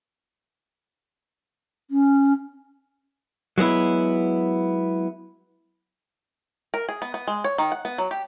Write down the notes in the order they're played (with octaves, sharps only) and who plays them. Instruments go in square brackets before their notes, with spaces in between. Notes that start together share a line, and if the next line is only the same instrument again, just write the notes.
[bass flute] C#4
[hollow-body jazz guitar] F#3 G#3 B3 E4
[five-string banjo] A#4
G#4
B3
B3
G#3
C#5
D#3
F#5
B3
F#3
G4